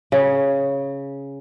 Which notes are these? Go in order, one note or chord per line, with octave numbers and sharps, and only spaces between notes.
C#3